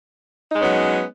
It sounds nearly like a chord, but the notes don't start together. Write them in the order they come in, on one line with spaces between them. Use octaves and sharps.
D#4 G#3 C#4 B3 F#3